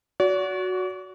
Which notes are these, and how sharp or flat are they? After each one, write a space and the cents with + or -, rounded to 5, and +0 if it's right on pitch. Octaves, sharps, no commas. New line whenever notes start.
F#4 -5 D5 -45